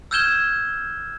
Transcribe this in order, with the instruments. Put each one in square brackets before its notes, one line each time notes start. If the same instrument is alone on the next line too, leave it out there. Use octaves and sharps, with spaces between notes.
[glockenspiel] E6 F6 G6 G#6 E7 G7